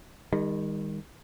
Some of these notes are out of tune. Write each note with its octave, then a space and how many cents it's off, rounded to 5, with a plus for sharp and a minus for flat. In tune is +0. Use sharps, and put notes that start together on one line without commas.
D#3 +0 G3 +45